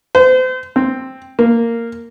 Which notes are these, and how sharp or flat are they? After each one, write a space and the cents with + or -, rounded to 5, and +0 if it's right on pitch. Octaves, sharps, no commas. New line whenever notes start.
C5 -35
C4 +5
A#3 -10